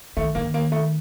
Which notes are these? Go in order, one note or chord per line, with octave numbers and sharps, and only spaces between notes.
D#3 A3
D#3 A#3
A#3
A3